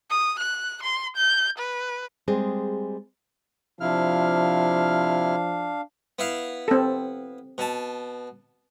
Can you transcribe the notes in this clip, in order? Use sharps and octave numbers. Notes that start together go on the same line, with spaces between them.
D#6
F#6
C6
G6
B4
G3 G#3 C4 G#4
C3 F3 D4 E4 F5 F6
B3 E4 F5
C4 A4
B2 A5